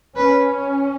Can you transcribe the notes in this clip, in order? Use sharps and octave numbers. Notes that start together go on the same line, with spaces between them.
C#4 B4